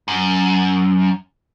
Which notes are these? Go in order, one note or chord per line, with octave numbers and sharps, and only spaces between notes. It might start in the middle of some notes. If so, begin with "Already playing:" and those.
F#2